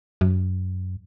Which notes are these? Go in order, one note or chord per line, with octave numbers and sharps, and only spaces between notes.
F#2